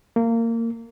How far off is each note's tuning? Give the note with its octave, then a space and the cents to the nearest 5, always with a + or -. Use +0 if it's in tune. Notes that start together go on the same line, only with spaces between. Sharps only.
A#3 -25